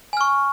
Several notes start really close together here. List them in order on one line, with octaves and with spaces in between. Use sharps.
G#5 F6 C#6